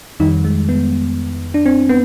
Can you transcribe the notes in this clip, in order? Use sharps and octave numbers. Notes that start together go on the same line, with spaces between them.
F2 D#3 G3 D#4
G#3
B3
D4
C4
B3